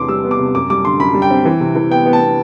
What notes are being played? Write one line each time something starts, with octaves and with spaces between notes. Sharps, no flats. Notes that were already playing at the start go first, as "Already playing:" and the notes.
Already playing: E2 C3 B3 C6 D6
G3 E6
B3
D6
C3
F#2 D6
G3 D6
D3 C6
F#2 B5
G3
G5
C4
E3
C3
E3
B3 G5
B3
A5
B3